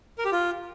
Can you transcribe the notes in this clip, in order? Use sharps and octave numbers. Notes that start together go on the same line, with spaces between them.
A#4
G4
F4